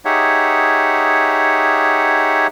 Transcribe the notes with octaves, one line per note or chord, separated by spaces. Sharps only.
D#4 G4 G#4 C#5 E5 F#5